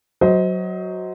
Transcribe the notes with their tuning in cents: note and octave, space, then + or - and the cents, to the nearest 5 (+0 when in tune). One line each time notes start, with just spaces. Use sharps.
F#3 +0 C5 -10 D#5 +25